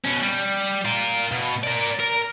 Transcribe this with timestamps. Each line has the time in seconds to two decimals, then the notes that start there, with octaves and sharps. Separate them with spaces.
0.05 B2 C#4
0.22 G3
0.85 F4 A#4
1.32 B2
1.64 A#4 D5
1.99 A#4